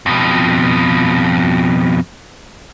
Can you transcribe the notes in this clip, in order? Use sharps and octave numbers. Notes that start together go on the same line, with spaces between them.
F2 B2